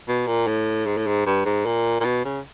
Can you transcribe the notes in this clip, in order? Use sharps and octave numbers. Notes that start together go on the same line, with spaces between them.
B2
A#2
A2
G#2
A2
G#2
G2
G#2
A#2
A#2
B2
C#3